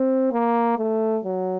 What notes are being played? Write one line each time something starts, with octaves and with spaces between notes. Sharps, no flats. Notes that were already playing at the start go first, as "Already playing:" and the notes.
Already playing: C4
A#3
A3
F#3